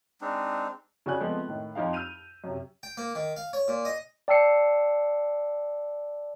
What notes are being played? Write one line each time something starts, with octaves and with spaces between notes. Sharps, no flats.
G#3 C4 D4 D#4
C#3 F#4 D5 G#5 F#6
F3 G#3 A3 B3 C4
A2 D#3
F2 F3 D#4 F5
E6 F6 G6 D#7 F7
F#2 C3
G5
A#3
D#3
F5
C#5
A#2
D#5
D5 G5 A5 E6 C7 C#7